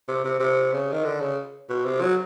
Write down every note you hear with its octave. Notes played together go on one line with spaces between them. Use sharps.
C3
C3
C3
C#3
D#3
D3
C#3
B2
C3
F#3